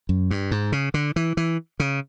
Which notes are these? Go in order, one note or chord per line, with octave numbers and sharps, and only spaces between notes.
F#2
G2
G#2
C#3
D3
E3
E3
C#3